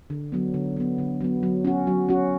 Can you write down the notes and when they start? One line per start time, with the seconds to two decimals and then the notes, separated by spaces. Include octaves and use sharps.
0.10 D3
0.32 F#3 B3
0.54 D3
0.76 F#3 B3
0.98 D3
1.21 F#3 B3
1.43 F#3
1.65 C#4 F#4
1.87 F#3
2.09 C#4 F#4